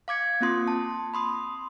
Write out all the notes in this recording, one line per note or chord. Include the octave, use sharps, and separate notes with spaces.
F5 D6 G#6 C#7
A#3 C4 F4 C6 D#6
A5
B5 C6 D#6